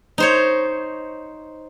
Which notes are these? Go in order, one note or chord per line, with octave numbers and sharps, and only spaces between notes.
D#4 C5 C#5